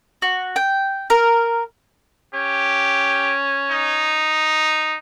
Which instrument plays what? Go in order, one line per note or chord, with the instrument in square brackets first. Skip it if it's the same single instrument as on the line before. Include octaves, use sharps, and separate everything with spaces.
[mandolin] F#4
G5
A#4
[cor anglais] C#4 [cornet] G4
[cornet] D#4